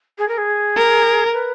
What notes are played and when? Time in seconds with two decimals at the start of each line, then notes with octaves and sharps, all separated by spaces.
0.18 G#4
0.28 A#4
0.38 G#4
0.76 A#4
1.33 B4